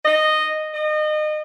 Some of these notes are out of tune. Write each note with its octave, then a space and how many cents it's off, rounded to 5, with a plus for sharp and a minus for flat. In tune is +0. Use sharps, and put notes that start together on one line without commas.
D#5 -10
D#5 -30